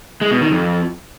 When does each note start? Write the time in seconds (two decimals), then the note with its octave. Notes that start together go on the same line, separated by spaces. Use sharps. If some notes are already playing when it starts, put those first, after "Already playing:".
0.21 G#3
0.31 B2
0.41 D#3
0.51 F2